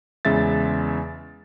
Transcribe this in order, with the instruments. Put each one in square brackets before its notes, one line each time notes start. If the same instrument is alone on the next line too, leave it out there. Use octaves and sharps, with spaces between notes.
[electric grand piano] E2 C#3 G#3 E5 A6